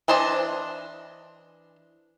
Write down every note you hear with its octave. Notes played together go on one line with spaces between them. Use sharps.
E3 D4 C5 D#5 A5